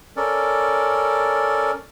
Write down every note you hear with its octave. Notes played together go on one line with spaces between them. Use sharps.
C#4 A4 A#4 D5